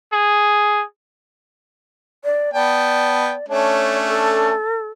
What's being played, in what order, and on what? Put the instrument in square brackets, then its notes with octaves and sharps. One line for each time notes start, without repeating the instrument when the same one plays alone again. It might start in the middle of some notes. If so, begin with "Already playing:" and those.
[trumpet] G#4
[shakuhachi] D5
[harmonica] B3 G5 A5 [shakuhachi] D5
[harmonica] A3 C#4 D4 [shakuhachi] C#5
[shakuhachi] A4